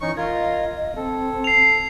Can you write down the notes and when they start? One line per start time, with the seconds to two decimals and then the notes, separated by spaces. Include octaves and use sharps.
0.01 E3 C#4 D#4 C#6
0.17 F4 A#4 D#5 G#6
0.96 C4 A4
1.44 C7 F7